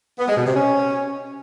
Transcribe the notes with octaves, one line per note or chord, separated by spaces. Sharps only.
B3
G#3
B2
C3
C#4